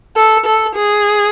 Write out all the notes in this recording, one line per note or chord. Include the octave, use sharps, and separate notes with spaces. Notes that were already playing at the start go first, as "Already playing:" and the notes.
A4
A4
G#4